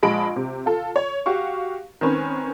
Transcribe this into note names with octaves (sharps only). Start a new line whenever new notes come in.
A#1 G#3 D#5 A5 B5 D7
C3
F4 A4
C#5
F#4 G4 F5 C#6
D#3 C4 C#4 B4